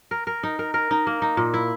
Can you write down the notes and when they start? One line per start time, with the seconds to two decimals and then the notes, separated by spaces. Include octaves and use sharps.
0.11 A#4
0.27 A#4
0.43 D#4
0.59 A#4
0.74 A#4
0.91 D#4
1.07 A#3
1.22 D#4
1.37 A#2
1.54 E4